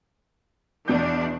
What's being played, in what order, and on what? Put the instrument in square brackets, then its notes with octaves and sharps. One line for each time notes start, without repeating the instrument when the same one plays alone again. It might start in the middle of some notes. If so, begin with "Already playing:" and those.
[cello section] E2 D4 [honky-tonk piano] B2 G6